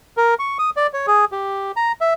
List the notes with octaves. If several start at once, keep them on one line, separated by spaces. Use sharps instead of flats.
A#4
C#6
D#6
D5
C#5
G#4
G4
A#5
E5